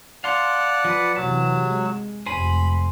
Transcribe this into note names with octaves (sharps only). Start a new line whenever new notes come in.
D5 F5 F#5 A5 C6
F3 B4
C3 E3 F#3 A5
G#3
F1 F2 C5 G#5 B5